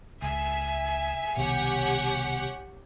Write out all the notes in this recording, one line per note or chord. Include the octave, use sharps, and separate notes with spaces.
C#2 E5 G#5
C2 B2 D#3 G4 C#5 F#5